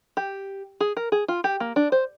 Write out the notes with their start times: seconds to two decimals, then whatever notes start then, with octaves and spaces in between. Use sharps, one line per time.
0.17 G4
0.80 G#4
0.97 A#4
1.12 G#4
1.28 F4
1.44 G4
1.60 A#3
1.76 D4
1.92 C5